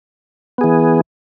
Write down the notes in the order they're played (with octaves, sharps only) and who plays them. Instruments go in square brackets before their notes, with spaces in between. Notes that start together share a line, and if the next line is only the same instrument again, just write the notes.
[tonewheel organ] B3
G#4
E3